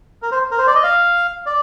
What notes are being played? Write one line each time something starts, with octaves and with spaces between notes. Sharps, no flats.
A#4
C5
A#4
C5
D5
D#5
F5
D5